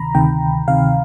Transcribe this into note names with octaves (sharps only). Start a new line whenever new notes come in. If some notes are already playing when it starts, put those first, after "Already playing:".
Already playing: D2 C3 D#3 A#5 B5
D2 C3 D#3 G5
D2 C3 D#3 F5